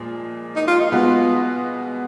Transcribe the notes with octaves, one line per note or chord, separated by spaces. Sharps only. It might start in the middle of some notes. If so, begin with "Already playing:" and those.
Already playing: A#2 F3 G#3
D#4
F4
D#4
B2 G#3 B3 F4 F#4